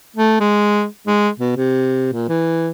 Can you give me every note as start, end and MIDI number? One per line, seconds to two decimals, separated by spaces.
0.16 0.36 57
0.40 0.86 56
1.07 1.29 56
1.40 1.52 47
1.57 2.09 48
2.13 2.28 46
2.29 2.70 52